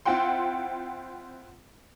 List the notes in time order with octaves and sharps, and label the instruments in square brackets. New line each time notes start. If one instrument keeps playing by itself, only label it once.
[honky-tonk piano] C4 E4 F4 F#5 G5 C6